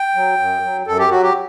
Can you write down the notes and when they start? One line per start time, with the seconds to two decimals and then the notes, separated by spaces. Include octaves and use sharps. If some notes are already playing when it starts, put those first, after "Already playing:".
Already playing: G5
0.15 F#3
0.39 F#2
0.64 F#3
0.87 F#2 A4
0.99 G4
1.11 F#3 F#4
1.23 G4